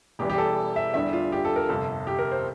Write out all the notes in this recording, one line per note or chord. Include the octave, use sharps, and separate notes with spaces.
E1 E2 E3 G3 G4
G4
A4
E5
E2 D3 G3 E5
F4
G4
A4
A#4
G1 F2 C3 A4
G4
A#4
C5